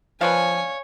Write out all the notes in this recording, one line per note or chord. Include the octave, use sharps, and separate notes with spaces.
F3 B4 C#5 D5 F5 G#5